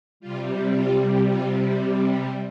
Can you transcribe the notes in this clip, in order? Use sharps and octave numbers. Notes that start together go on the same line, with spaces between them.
C3 G3 F4
F4
F4